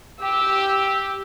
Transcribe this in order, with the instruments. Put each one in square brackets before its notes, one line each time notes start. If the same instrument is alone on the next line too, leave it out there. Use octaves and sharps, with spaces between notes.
[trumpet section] G4 [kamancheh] E6